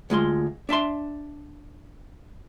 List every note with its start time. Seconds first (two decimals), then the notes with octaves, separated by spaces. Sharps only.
0.10 D2 G#3 F4 C6
0.69 D4 E5 A5 C6